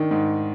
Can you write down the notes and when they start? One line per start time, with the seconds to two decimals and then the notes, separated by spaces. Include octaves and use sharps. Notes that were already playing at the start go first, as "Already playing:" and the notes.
Already playing: D#3 D4
0.11 G#2